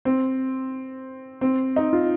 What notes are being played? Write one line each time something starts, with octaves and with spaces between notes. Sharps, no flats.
C4
C4
D#4
F4